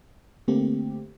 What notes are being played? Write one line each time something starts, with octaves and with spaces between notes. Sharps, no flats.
D3 A3 A#3 C4 G4